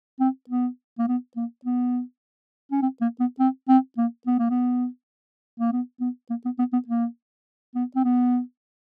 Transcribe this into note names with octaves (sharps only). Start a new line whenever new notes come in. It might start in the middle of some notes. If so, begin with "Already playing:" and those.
C4
B3
A#3
B3
A#3
B3
C#4
C4
A#3
B3
C4
C4
A#3
B3
A#3
B3
A#3
B3
B3
A#3
B3
B3
B3
A#3
B3
C4
B3